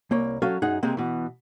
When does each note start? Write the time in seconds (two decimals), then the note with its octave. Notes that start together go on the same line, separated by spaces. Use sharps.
0.11 C2 A#3 C#5
0.42 F#3 C#4 A4 F5
0.62 F#2 D#4 G#4 F#5
0.83 C3 G#3 A#3 C4
0.97 B2 E3